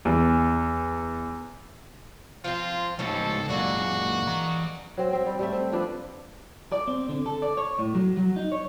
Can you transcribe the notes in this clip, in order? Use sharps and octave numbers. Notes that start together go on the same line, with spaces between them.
E2
F3 C4 F4
C#2 A2 C4 C#4 D#4 A4
F#2 A#2 G#3 A#3 D4 F#4
E3 A#5
F#3 C4
C4 E5
G3
G3 A3 E5
C4
F3 D4 B4
D5
C4
D3
A4
D5
C#5
A2
F#3
F#3
D#4
C#5